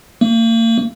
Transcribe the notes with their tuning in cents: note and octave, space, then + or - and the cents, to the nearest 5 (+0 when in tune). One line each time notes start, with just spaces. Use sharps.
A#3 -40